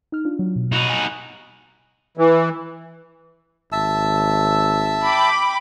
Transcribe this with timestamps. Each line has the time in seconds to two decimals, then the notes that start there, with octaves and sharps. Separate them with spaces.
0.12 D#4 F6
0.25 D4 F4
0.39 F#3
0.56 B2
0.72 D#4 F#4
0.89 G#5
2.17 E3
3.72 G#1 E5 A5 E6
5.05 G5 B5 D6